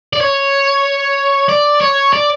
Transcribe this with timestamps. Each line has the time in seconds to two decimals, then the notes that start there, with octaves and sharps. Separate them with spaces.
0.13 D5
0.21 C#5
1.48 D5
1.81 C#5
2.13 D5